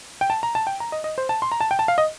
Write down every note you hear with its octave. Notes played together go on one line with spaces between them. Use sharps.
G5
A5
A#5
A5
G5
A#5
D#5
D#5
C5
A5
C6
A#5
A5
G5
A5
F5
D#5